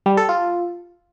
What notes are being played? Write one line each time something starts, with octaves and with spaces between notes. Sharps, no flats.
G3
A4
F4